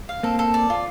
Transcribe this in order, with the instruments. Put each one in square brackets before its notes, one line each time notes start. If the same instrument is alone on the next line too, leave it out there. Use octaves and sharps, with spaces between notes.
[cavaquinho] F5
[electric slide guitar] A#3 C4 [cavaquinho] A4
[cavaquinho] A4
D5
F4